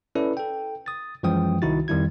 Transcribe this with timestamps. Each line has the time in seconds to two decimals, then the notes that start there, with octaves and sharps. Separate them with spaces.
0.15 C#4 E4 A4 B4 D5
0.37 A4 G5
0.86 D#6 A6
1.23 F#2 E3 F3 G#3 G5 D#6
1.62 C2 D#3 D#4 E4 F#4 A6
1.88 F2 D#3 G3 E4 G#6